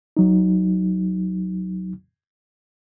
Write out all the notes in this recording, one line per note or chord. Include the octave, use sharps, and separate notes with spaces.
C2 F#3 D#4